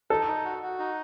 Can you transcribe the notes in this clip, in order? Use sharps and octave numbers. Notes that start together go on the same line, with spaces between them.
D#4 A4
D#4
F#4
F#4
D#4